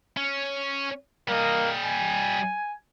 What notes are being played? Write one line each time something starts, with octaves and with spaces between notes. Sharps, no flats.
C#4
G3 A#3 D#5
G#5